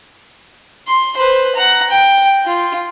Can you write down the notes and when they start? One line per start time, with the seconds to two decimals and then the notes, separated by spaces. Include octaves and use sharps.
0.88 C6
1.17 B4 C5
1.55 F#5 A#5
1.90 G5
2.46 F4